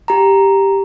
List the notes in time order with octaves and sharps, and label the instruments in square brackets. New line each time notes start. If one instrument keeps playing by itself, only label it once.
[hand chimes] G4 A#5